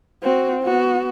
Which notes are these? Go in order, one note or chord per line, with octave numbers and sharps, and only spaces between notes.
C4 F#4
B3 F#4